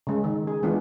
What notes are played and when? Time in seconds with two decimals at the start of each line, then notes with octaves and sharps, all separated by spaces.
0.07 C#3 G#3
0.24 D#3
0.47 G#4
0.63 E3 G#3 B3 D4 F4